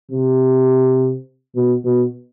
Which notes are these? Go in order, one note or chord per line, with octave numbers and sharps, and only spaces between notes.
C3
B2
B2